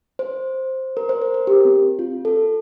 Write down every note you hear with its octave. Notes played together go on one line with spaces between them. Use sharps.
C5
A#4
C5
A#4
A#4
G4
C4
F4
A4